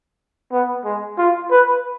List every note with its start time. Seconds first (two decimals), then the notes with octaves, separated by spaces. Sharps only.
0.52 B3
0.85 G#3
1.18 F4
1.51 B4